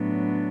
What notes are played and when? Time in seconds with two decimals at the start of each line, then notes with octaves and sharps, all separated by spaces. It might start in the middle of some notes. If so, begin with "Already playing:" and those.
Already playing: A2 F#3 B3 D4